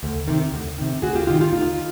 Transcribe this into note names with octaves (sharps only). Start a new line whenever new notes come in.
D2
C3 D#3
D2
C3 D#3
D2 F#4 G#4
F4 G4
C3 D#3 F4 G4
F4 G4
D2 D#4 F4